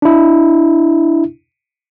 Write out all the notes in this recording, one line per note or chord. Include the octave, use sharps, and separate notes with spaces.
D4 E4